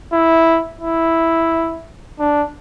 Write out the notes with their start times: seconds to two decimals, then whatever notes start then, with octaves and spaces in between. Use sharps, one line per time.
0.13 E4
0.81 E4
2.20 D4